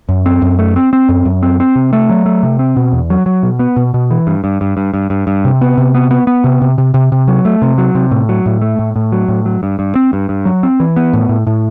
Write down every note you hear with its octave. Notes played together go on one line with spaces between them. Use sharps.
F#2
C4
F#2
A3
C4
C4
F#2
F#2
C4
C4
C3
A3
F#3
A3
C3
C4
B2
E2
F#3
F#3
B2
B3
B2
B2
E3
G2
G2
G2
G2
G2
G2
G2
C3
B3
C3
B3
B3
B3
C3
C3
C3
C3
C3
F#3
A3
C3
F#3
C3
A2
F#3
A2
A3
A2
A2
F#3
A2
F#3
G2
G2
C4
G2
G2
F#3
C4
E3
B3
A2
A2
A2